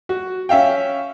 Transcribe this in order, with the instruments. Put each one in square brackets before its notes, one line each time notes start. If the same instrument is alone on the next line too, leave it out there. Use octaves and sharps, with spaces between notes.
[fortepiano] F#4
C#4 E5 F5 G5